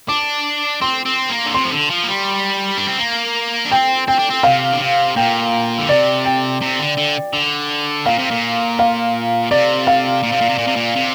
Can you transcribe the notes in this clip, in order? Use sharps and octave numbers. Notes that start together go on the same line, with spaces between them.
D4 D6
C4 C6
C4
A#3
D3
C3 C6
F3
D3
F3
A#3
G3
D4
C4
A#3
D4
C4 G5
C4 G5
D4
C4
C3 F5
D3
C3
A#2 G5
D3
C3 D5
G5
C3
D3
D3
D3
A#2 F5
C3
A#2
F5
C3 D5
F5
A#2
C3
A#2
C3
A#2
C3
A#2
C3